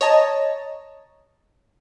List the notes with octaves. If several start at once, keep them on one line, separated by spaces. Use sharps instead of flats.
C#5 D#5 A5 A#5